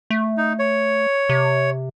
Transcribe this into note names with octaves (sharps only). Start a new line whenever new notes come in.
A3
D#4
C#5
C3